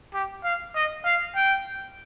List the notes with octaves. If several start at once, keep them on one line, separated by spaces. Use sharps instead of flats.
G4
F5
D#5
F5
G5